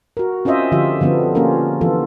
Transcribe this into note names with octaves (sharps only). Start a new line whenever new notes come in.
F#4 A#4
C4 C#4 F4 C5 D#5 E5
D3 F3 F4 G4 E5
D3 F3 B3 C4 D4
A#3 C#4 F4 G4 A#4
E3 F3 B3 F4 A4